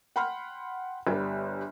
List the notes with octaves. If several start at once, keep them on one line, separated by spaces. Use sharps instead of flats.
F#5 G5 B5 C6 F6
G1 G3